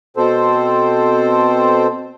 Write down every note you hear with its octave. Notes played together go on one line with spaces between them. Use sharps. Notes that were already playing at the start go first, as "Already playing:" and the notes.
B2 C4 A4 C5